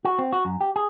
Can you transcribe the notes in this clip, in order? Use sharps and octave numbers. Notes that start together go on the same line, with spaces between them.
F#4
C4
F#4
F#2
G4
G#4